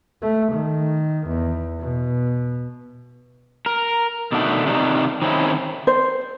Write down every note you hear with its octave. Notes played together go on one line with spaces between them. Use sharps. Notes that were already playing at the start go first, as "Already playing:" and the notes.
A3
D#3
E2
B2
A#4
B2 D3 D#3 A3 D4 D#4
C3 D#3 G3 D4 D#4
D#3 C4 C#4 D#4 E4
C5